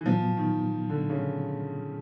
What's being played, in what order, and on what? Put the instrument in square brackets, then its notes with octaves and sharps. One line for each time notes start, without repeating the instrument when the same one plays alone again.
[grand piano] E3
[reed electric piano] A#2 F#3 B3 [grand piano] F3
[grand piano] D#3
D3
C#3